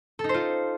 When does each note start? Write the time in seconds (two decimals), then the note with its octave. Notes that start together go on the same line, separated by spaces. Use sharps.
0.19 A4
0.24 D#4
0.29 C5
0.34 F4